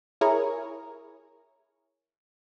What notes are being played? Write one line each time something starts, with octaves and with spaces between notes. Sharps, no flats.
E4 G#4 A#4 C#5